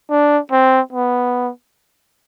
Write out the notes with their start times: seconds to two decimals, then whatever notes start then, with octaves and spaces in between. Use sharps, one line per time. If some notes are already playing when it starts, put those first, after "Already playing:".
0.10 D4
0.52 C4
0.93 B3